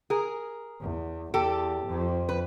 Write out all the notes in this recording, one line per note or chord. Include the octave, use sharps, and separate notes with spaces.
G#4 A#4
E2
E2 G4 A4
F2
B4